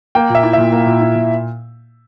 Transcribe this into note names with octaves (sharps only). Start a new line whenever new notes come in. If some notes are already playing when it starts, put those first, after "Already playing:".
A#3 G5
A#2 E5
E4
A#2 E5
A#3
A#2
E4
A#2